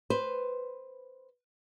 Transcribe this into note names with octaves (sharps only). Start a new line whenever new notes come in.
B4 C5